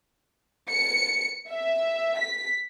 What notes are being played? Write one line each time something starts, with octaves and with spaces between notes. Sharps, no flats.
C#7
E5
B6